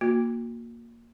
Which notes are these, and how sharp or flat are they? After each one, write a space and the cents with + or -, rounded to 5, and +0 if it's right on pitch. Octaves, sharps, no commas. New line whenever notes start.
A#3 +0 F#4 -35